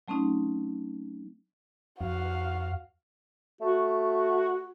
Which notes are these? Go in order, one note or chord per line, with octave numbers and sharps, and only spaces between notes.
F#3 A3 C4 C#4 D#4
F2 F#4 F5
A3 F#4